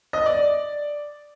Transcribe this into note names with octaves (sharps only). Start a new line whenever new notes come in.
D#5
D5